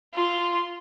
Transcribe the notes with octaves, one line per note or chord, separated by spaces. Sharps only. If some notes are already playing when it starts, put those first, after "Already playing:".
F4 C6